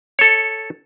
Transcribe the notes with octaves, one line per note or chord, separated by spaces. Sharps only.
A4 C#5